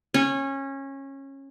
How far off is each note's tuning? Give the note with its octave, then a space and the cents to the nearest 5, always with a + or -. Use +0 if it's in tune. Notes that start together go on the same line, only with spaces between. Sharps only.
C#4 -20